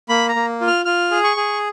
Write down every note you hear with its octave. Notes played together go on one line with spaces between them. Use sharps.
A#3 B5
A#5
A#3
F4
F6
F4 F6
G#4
C#6
G#4